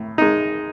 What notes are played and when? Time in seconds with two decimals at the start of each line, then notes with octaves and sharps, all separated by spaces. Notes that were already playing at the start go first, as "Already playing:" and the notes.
Already playing: A2
0.18 G#3 D#4